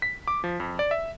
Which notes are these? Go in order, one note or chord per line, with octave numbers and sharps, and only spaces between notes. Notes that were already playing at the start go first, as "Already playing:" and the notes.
B6
D6
F3
F2
D5
E5